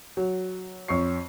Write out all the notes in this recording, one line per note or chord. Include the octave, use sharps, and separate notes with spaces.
F#3
F2 C#5 C#6 C7